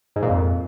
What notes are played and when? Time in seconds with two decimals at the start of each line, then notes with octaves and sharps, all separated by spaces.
0.16 G#2
0.23 A#2
0.29 F2